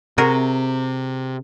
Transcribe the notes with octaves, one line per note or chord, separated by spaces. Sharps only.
C3 F#4 G#4 A#4